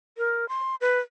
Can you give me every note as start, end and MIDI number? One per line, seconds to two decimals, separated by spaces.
0.18 0.48 70
0.49 0.75 84
0.81 0.99 71